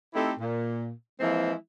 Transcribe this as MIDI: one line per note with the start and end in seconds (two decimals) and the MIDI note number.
0.15 0.33 57
0.15 0.33 60
0.15 0.33 63
0.15 0.33 64
0.15 0.33 67
0.15 0.33 69
0.40 0.91 46
1.20 1.53 52
1.20 1.53 53
1.20 1.53 56
1.20 1.53 58
1.20 1.53 60
1.20 1.53 64